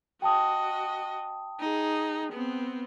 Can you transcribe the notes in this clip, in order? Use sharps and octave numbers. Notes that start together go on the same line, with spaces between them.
F#4 D#5 G5 A5 D#6
D#4 G#4
B3 C4